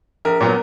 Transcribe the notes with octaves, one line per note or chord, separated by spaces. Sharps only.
A#1 A#4
A#2 F#3 B3